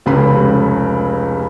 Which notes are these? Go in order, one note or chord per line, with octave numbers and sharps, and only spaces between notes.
F1 C#2 C#4 G4 A4 B5